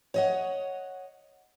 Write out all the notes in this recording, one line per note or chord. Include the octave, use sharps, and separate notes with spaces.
C#5 D#5 F#5